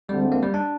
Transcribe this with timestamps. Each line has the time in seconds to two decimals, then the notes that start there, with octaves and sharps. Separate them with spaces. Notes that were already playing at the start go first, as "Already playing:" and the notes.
0.09 D2 D3 G3 G#3 C4
0.32 A#3
0.43 G3
0.54 D4